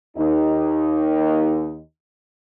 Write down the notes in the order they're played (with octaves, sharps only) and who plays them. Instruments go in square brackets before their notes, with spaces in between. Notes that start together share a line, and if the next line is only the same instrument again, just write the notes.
[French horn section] D#2 D#4